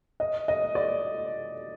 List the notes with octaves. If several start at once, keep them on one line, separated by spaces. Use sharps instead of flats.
D#5
D#5
D5